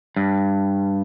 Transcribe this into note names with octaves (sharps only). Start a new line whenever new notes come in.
G2